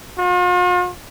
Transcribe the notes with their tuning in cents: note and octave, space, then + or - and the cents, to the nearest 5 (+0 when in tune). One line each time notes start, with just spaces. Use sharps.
F4 +45